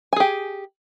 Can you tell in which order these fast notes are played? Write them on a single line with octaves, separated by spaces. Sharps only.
G#5 G#4 G4